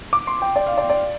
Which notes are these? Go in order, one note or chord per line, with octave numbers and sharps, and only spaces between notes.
D6
C6
G5
D5
F5
D5
D5